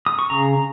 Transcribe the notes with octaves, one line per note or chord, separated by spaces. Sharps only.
D#6
C#6
C#3 A#5